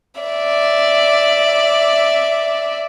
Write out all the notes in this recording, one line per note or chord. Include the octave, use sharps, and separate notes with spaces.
D5 E5